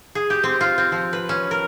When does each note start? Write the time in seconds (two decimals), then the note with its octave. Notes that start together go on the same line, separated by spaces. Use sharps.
0.15 G#4
0.30 G4
0.43 C4
0.61 F4
0.78 C4
0.92 F3
1.13 B4
1.29 C#4
1.51 A#4